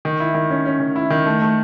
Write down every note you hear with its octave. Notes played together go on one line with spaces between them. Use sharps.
D#3
E4
D#3
C#4
C#4
D#3
E4
D#3
A3
A3